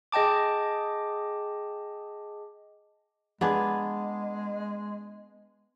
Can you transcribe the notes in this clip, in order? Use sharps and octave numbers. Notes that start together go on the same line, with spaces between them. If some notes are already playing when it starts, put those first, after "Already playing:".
G#4 D#5 G5 A5 D6
G#3 B3 D4 G#4